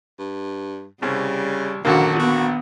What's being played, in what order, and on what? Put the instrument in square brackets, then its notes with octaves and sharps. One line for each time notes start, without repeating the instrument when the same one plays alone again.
[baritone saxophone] G2
[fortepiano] C2 [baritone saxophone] C#3 [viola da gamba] G3
[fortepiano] A#1 D3 A#3 [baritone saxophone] F#2 [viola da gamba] D#3 F#4
[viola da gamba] B3 [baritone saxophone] F#4